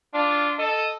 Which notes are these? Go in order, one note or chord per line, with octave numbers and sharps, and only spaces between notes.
D4 F4
A4 D#5